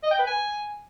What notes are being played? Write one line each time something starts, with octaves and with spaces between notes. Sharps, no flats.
D#5
G5
B4
G#5